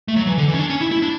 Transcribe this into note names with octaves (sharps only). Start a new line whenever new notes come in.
A3
F#3
E3
D3
E3
C#4
D4
C#4
E4
E4
D4